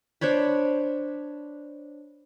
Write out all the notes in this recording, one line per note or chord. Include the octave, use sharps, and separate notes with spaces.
D4 C5 C#5 B5